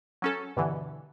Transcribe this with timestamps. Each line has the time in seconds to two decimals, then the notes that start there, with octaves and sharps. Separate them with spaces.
0.22 F#3 C#4 A4
0.57 G2 B2 D3 E3